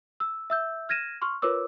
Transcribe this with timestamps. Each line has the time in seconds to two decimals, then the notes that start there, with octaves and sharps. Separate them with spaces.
0.20 E6
0.50 E5 E6 G6
0.89 F6 G#6 A#6 D#7 E7
1.22 C6 C#6 F6
1.42 F4 A#4 B4 C#5 D6 E6